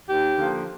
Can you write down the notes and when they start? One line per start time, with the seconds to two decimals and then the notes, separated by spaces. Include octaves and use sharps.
0.08 D#2 G4
0.36 D3 F3 A#3